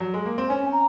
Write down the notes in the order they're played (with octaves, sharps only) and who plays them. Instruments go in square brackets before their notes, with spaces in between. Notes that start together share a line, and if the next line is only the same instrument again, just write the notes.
[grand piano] F#3
G#3
A#3
C4
[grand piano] C#4 [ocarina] G#5
[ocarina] A#5